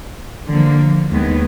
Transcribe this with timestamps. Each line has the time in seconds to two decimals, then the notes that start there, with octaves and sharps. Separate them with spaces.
0.49 D3 F3 A#3
1.11 D#2 D#3 G#3 B3